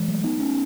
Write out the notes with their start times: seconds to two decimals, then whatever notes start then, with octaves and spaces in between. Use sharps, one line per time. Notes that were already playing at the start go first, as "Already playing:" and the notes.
Already playing: E3 G#3
0.08 F#3 A3
0.24 B3 D#4
0.40 A3 C#4